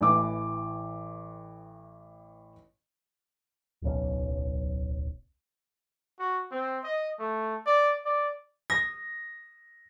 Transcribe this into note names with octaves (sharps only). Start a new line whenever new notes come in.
A1 E3 D6
D1 B1 C#4
F#4
C4
D#5
A3
D5
D5
D#6 A#6